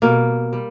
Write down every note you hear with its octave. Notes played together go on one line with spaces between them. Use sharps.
B2 G3 A#3
G3